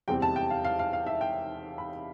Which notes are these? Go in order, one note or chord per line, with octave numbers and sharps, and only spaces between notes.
E2 C3 G3 C4 G5
A5
G5
F5
F5
F5
F5
E5
G5
B5